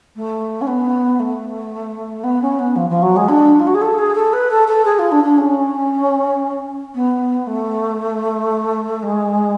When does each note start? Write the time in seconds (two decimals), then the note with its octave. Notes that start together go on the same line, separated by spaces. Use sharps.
0.16 A3
0.61 C#4
0.67 B3
1.19 A3
2.23 B3
2.41 C#4
2.58 B3
2.75 F3
2.89 F3
3.02 F#3
3.16 G#3
3.28 D4
3.59 F4
3.66 F#4
3.74 G#4
3.81 A4
3.98 G#4
4.15 A4
4.33 B4
4.50 A4
4.67 A4
4.84 G#4
4.98 F4
5.11 D4
5.23 D4
5.37 C#4
6.94 B3
7.47 A3
9.02 G#3